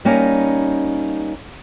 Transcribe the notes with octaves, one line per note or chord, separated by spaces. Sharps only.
G3 A#3 C#4 D#4